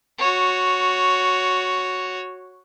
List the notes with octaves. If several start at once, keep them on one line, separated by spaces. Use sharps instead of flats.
F#4 C#5